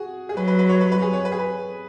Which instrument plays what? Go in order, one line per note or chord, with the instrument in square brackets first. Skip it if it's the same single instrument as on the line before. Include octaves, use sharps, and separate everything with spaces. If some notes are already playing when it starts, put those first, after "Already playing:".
Already playing: [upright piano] F#4 G#4
G#4
[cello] F#3 [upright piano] B4
[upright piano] B4
B4
C#5
B4
B4
G#4
C#5
B4
G#4
B4